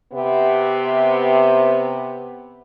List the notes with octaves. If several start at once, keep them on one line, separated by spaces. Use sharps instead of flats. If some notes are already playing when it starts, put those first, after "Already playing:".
C3 B3